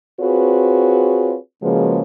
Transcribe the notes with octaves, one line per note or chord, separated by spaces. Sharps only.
C4 F4 F#4 G#4 B4 C#5
C#3 F3 G#3 A#3 F#4 B4